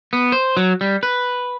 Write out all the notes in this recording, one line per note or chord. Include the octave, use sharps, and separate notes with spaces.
B3
C5
F#3
G3
B4